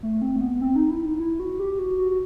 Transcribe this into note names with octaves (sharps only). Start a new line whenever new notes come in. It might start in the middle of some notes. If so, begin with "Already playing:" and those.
A3
C4
A3
B3
C4
D#4
E4
D#4
E4
F#4
G4
F#4
F#4
F#4